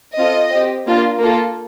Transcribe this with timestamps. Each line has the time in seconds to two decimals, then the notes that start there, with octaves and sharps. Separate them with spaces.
0.17 C4 F4 A4 D#5
0.51 C4 G4
0.86 A#3 D4 F4
1.20 A#3 F4 A4